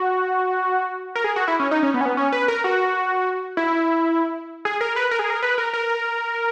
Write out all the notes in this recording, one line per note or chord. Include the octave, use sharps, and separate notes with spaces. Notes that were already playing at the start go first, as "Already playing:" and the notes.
Already playing: F#4
A#4
G#4
F#4
E4
C#4
D#4
C#4
B3
C#4
B3
C#4
B4
A#4
F#4
E4
G#4
A#4
B4
A#4
G#4
A#4
B4
A#4
A#4